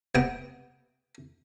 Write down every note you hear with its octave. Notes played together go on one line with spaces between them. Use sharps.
C3 B3 G5 D#6